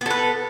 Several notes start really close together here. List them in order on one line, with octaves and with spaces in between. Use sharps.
B3 A4 B4